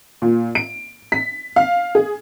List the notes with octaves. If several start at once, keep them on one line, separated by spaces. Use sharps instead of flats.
A#2
D7
B6
F5
G#4